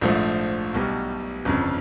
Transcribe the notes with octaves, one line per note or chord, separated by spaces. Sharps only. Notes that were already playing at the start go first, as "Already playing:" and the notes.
A#1 G#2 F3 A3
B1 B2 G3
G1 F2 C#3